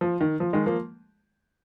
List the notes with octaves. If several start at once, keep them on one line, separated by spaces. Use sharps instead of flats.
F3
D#3
F3
D#3 G#3
F3 A#3